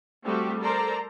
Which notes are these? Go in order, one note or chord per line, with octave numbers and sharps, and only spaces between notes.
G3 A3 C4 F#4 G4
A4 A#4 C5 D5 A#5